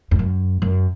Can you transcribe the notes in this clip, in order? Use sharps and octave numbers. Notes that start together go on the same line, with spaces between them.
F2
F#2
F#2